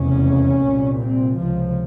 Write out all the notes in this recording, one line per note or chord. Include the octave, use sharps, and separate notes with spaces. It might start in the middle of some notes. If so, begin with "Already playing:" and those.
Already playing: F1 E2 C#3 C#4
C2 A#2
C4
C#2 C3 F3